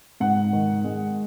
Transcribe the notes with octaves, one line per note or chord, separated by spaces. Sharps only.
G#2 F#5
D#3
G#3